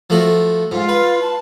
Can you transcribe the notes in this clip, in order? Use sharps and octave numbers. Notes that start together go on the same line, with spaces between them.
F3 A3 F#4
G#2 F4
B4
A5